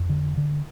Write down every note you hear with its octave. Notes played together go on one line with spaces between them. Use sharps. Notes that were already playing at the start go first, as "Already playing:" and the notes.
Already playing: F2
D3
D3